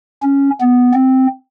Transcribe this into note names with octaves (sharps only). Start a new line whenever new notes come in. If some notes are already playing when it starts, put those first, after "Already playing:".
C#4
B3
C4